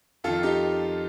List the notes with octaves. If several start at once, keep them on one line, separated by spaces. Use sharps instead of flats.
F2 D#3 F4 A4
D#4 G4